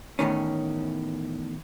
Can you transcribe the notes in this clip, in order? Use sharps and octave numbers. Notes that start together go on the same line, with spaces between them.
E2 A2 D#3 C#4